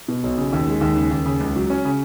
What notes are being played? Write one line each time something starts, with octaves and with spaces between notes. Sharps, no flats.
B2
B1
C#3
D#2
G#3
D#2
C#3
D#2
C#3
C#2
F#3
C#4
C#3